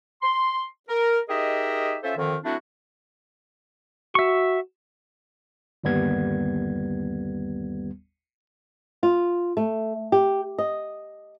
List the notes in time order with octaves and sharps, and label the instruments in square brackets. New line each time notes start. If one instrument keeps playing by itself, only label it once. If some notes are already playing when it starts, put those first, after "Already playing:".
[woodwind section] C6
A#4
D#4 G4 G#4 A#4 D#5 E5
C#4 F4 A4 C5 E5
F2 D3 D#3
F#3 A3 C4 D4 E4 F#4
[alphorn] F#4 [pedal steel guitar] E5 C#6
[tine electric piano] G1 D#2 G3 B3 G#6
[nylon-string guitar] F4
A3
G4
D#5